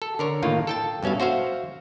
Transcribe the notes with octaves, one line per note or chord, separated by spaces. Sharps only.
A4
D3 A#4 C#5
A2 D#3 A#3 F4
A4 G5 A5
G2 B2 C#4 E5 F5
F#4 C5 E5 F5